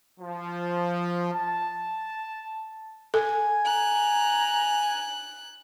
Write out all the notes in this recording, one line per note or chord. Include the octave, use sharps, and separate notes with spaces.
F3
A5
A4 G#5
A#5 F#6